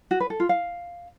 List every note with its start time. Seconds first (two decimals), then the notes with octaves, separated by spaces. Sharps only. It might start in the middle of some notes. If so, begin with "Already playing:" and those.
0.11 F#4
0.20 B4
0.30 A4
0.40 F4
0.49 F5